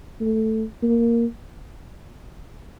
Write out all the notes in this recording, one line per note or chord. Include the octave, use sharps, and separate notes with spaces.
A3
A#3